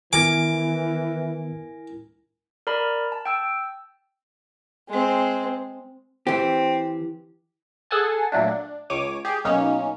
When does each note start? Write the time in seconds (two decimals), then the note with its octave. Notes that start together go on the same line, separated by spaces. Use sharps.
0.13 D#3 E3 B3 E4 A#4 G#5 D6
2.67 A#4 D5 A#5 B5
3.12 A5
3.26 G5 E6
4.89 G#3 C4
6.27 E3 C4 G4
7.91 G#4 A4 F#5 G#5 A5
8.32 A#2 F#3 A3 D4
8.48 D4
8.90 C#2 C#5 D6 D#7
9.25 G4 G#4
9.45 B1 A#3 C#4 D#4 C#5